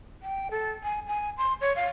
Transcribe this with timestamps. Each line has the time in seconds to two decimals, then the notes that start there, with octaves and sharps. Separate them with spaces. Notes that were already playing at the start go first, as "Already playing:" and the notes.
0.22 G5
0.51 A4
0.84 G#5
1.07 G#5
1.37 C6
1.61 C#5
1.76 F5